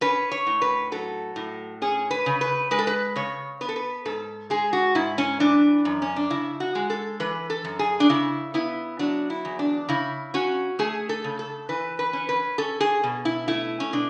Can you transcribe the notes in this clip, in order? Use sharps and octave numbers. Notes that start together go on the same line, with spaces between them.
C#4 B4
C#5
A2
B4
F#3 A4
A2
C#4 G#4
B4
C#3
B4
G#3 B4
A4
B4
C#3 C#5
B3 B4
A4
B4
G#2 A4
G#3 G#4
F#4
G#2 E4
C#4
E3 D4
F#2
C#4
D4
C#3 E4
F#4
G#3
A4
E3 B4
A4
F#2
G#4
D4
C#3 E4
B3 E4
F#3 D4
E4
E2
D4
C#3 E4
C#4 F#4
A3 G#4
A4
C#3
A4
E3 B4
B4
C#4
B4
C#4 A4
G#4
B2
E4
A3 E4
C#4
B2 D4